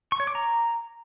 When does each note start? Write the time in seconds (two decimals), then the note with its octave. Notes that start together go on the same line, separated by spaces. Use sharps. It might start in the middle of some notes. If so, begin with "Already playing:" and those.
0.12 C#6
0.20 C#5
0.27 D6
0.35 A#5